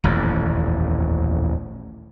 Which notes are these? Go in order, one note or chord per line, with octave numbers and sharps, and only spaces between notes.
D#1 A1 F2